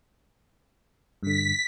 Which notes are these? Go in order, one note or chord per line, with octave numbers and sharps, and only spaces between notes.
G2 D3 B6